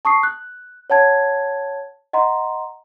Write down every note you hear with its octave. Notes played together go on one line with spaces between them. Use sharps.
A5 C#6 D#6 C7
F#6
C#5 F#5 A5 G#6
D#5 F#5 A#5 C6